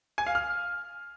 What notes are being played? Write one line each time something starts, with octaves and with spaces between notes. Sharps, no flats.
G#5
F5
F6